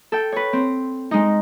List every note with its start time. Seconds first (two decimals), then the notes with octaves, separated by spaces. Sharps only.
0.12 A4 G5
0.32 B4 C#5
0.53 C4
1.11 G#3 D#4